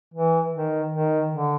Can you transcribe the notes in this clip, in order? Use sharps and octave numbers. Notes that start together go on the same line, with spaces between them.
E3
D#3
D#3
D3